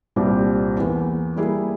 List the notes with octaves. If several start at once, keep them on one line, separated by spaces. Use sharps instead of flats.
C2 A#2 G3 C4 G4
E2 E3 A#3
G3 A#3 E4 G#4